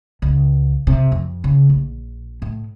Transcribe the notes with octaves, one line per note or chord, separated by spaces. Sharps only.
C#2
C3
F2
C#3
A#1
A2